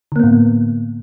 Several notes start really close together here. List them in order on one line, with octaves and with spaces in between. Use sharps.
D3 A#3 B3 A2